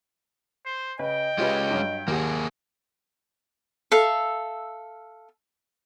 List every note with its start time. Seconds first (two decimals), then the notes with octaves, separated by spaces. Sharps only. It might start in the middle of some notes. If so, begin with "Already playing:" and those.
0.66 C5
0.99 C#3 B4 D#5 G5
1.38 G#3 C#4 F4 G4 B4
1.70 G2 F#3
2.08 D#2 A#3 G4 G#4 F#5
3.92 A4 E5 F5